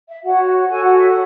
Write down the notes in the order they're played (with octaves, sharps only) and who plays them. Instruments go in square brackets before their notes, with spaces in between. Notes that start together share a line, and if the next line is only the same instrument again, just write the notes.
[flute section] E5
F#4 C#5 F#5
F#4 A4 C#5 G#5
F#5
E5
F#5